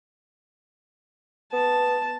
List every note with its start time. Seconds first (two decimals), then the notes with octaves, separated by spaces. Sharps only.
1.53 B3 A5